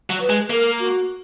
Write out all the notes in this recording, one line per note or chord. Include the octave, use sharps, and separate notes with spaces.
F#3
B4
G#3
A#3 A#4
F#4